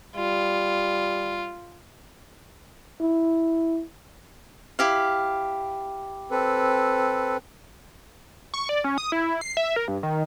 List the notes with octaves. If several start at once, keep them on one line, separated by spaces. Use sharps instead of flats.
G3 F4
E4
E4 G4 F5
C4 A4 B4
C#6
D5
C#4
D#6
E4
C7
E5
A#4
G2
D#3